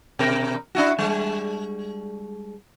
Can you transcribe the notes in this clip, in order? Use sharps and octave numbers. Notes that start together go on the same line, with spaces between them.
B2 A#4
D4 E4 F#4
G3 G#3